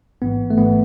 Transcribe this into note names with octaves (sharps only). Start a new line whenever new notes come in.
A1 G#2 E3 B3
A3
A1 G#2 E3 B3